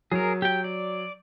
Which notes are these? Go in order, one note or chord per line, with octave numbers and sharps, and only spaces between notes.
F#3 G#4 A#4
G4 G5
D5